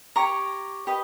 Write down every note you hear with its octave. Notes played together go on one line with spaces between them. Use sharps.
G4 C#5 A#5 C#6
G4 B4 D#5